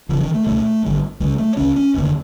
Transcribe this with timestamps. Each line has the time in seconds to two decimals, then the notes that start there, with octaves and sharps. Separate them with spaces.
0.09 E1 E2 C#3 F3
0.21 D#3
0.34 A3
0.46 C#2 B2 A3
0.83 G#1 G2 D3
1.20 C#2 C#3 G#3
1.38 A3
1.57 C#2 C#3 C#4
1.76 C#4
1.94 F1 D#2 D3